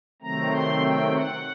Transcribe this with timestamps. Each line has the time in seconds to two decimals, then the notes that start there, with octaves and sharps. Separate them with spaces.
0.22 C3 D#3 F#3 A3 C4 A#5
0.52 C6
0.82 G5
1.12 F#5